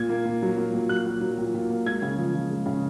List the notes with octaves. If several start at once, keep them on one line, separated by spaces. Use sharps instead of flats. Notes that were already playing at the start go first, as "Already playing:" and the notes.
Already playing: A#2 G#6
A#3
A#2
F#3
A#3
A#2
F#3 F#6
A#3
F#3
A#2
A#2
A#3
G#3 G#6
C#3
F3
F3
G#3
C#3